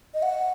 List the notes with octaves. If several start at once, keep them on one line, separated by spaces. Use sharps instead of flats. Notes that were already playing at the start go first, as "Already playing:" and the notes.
D#5
F#5